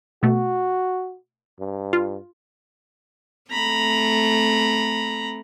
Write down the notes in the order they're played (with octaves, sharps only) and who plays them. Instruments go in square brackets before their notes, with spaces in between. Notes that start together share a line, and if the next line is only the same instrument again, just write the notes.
[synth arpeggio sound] B2 A3 [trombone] F#4
[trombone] G2
[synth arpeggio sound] F4
[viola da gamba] A3 C4 [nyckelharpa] A#5 B5